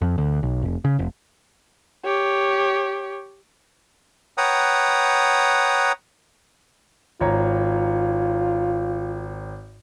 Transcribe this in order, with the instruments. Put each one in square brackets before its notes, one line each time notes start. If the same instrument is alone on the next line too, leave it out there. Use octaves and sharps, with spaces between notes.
[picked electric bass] F2
D2
B1
F1
C#3
F1
[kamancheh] G4 C#5
[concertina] B4 C#5 F#5 G5 A#5 D#6
[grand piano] G#1 C#5 A#5 [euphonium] F4